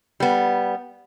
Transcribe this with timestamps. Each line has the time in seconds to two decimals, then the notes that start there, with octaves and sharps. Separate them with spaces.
0.20 G3 B3